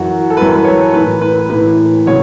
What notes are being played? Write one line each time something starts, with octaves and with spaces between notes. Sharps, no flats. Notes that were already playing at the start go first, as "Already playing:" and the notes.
Already playing: F#2 E3 F#4
A4
F#2 E3 B4
B4
C#5
A2 E3 B4
B4
A2 E3 B4
C#3 F#3 C#5